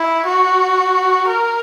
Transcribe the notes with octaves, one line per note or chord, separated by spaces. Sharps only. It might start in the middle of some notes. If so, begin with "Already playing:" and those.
Already playing: E4
F#4
A#4